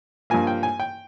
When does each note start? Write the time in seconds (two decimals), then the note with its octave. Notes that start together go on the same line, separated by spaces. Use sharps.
0.30 G2 F3 A#3 G#5
0.47 G5
0.63 G#5
0.80 G5